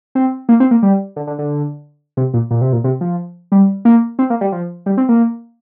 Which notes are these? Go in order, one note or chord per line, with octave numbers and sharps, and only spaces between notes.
C4
A#3
C4
A#3
G3
D3
D3
D3
C3
A#2
A#2
C3
A#2
C3
F3
G3
A#3
C4
A#3
G3
F3
G3
C4
A#3